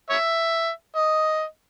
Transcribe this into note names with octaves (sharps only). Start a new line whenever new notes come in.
C#5 E5
D#5